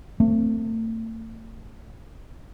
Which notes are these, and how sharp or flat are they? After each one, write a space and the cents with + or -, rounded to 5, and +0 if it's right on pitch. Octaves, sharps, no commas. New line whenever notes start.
A3 +40 C4 +0